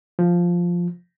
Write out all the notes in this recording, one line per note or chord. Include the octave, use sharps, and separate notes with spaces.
F3